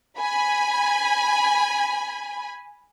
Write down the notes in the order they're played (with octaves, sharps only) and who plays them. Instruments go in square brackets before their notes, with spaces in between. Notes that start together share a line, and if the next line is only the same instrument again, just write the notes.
[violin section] G#5 B5